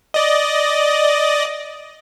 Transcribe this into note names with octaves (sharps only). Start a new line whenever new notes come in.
D5 D#5